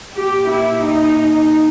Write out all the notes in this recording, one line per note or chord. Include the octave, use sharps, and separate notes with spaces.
A#2 G4
E4
D#4